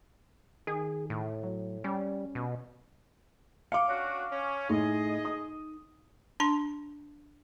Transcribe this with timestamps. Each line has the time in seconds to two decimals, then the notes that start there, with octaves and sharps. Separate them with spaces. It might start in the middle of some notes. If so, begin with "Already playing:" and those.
0.67 D#3 G#4
1.10 A2
1.43 F#3
1.84 G3 C#4
2.35 B2
3.72 F5 D6 C#7
3.88 C#4 D4 F#4
4.31 C#4
4.69 A2 D#4 G#4 D#5
5.25 D#6
6.40 D4 A5 C6